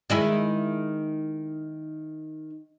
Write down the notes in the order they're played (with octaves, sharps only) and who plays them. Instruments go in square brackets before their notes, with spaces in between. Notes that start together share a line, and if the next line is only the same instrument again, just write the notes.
[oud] D#3 G#3 E4